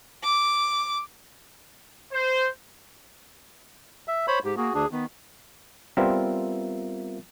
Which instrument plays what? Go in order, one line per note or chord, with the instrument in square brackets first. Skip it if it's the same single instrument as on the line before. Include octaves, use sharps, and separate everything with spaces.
[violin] D6
[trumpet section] C5
[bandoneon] E5
C5 C#5 B5
[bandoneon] G#2 [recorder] G4
[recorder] A#3 [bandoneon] F#4 G#4
[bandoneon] D2 D4 [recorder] G#4
[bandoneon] D#3 [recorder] B3
[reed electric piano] G3 B3 C4 F4 A#4 E5